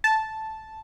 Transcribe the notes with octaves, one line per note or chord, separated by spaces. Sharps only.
A5